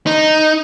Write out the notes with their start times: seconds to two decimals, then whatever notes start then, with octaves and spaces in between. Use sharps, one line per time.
0.06 D#4